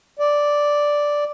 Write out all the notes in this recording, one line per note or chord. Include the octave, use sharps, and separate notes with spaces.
D5